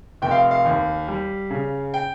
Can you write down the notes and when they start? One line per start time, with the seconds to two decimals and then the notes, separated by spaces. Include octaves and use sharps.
0.22 F1 G5
0.31 F5
0.51 F5
0.65 D#2
1.08 G3
1.50 C#3
1.94 G5